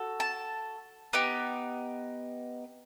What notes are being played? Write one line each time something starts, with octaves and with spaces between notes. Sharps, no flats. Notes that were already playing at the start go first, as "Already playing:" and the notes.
Already playing: F#4 A4
A5
B3 D#4 G4